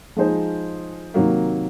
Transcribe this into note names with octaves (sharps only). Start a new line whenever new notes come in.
F3 G#3 D#4 G#4 C5
C3 D#3 F#3 A#3